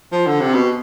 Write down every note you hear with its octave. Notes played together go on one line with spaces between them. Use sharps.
F3
D3
C3
B2